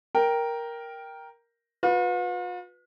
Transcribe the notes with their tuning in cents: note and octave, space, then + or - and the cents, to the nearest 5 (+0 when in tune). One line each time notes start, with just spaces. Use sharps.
A#4 +5 G5 +0
F4 +45 B4 +0